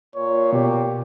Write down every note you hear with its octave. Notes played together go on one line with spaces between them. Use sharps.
A#2 C#5
B2 G4